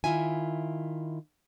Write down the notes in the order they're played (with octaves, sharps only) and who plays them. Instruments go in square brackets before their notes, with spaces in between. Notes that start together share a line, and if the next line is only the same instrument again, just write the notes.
[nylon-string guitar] D#3 G#3 E4 F4 E5 G#5